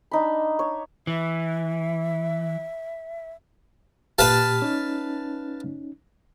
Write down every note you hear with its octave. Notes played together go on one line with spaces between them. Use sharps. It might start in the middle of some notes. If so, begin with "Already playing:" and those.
D4 D#4 B5
C#5
E3 E5
A#2 G4 B4 F5 A5
C#4 D#4